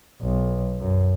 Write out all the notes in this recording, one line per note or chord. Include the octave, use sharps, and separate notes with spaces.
B1
F#2